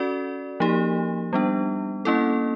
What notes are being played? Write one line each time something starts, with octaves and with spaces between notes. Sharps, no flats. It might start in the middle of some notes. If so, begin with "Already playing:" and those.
Already playing: C#4 F#4 A4 D5
F3 A#3 D#4 G4
G3 B3 D4
A#3 C#4 E4 A4